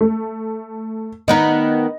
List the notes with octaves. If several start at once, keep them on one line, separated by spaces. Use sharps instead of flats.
A3
D#3 B3 D#4 D#5